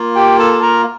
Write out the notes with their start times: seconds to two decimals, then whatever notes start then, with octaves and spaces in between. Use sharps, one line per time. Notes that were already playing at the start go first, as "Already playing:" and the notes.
Already playing: A#3 F4
0.16 G4 G5
0.39 A4 A5
0.53 A5
0.62 A#4 A#5